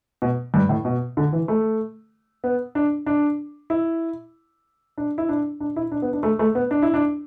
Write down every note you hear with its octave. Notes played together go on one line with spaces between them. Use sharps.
B2
G2
A2
B2
D3
E3
A3
B3
D4
D4
E4
D4
E4
D4
D4
E4
D4
B3
D4
A3
A3
B3
D4
E4
D4